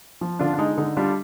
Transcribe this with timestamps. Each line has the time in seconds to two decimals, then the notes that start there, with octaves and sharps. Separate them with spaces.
0.21 F3
0.39 D3 D4 F4
0.53 D4
0.59 G#3 D#4
0.77 D3 D#4
0.97 G3 D4 F4